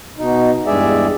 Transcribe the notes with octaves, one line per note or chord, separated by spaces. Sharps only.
B2 D#4
E2 G2 G#3 G#4 D5 E5